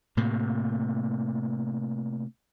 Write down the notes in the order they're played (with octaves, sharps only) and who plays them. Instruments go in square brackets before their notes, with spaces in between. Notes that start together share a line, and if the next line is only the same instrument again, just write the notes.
[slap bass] A2 C3 A#3